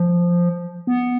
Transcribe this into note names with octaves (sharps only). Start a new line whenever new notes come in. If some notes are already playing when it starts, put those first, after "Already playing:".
Already playing: F3
B3